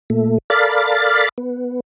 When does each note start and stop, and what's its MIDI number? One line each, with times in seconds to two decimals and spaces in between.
0.10 0.38 46
0.10 0.38 57
0.50 1.29 69
0.50 1.29 70
0.50 1.29 74
0.50 1.29 77
0.50 1.29 83
0.50 1.29 93
1.38 1.80 59